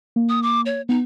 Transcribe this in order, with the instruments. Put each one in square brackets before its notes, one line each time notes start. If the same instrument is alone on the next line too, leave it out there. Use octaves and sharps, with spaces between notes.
[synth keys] A#3
[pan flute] D#6
D6
C#5
[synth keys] B3 [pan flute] D#4